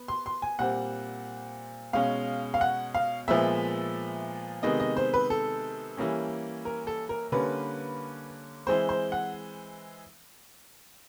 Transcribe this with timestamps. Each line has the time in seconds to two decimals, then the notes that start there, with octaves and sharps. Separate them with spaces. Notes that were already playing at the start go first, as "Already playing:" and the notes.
Already playing: B3
0.08 C6
0.26 C6
0.42 G#5
0.59 A#2 G3 C4 F#5
1.93 B2 G#3 C#4 F5
2.54 F5
2.61 F#5
2.95 F5
3.28 A#2 F3 G#3 B3 E5
4.63 C3 D#3 G#3 B3 D#5
4.80 D#5
4.97 C5
5.14 B4
5.30 A4
5.97 E3 G3 A#3 C#4
6.65 A#4
6.87 A4
7.09 A#4
7.32 D3 G3 A#3 C#4 B4
8.67 E3 G#3 C4 C5
8.89 C5
9.12 F#5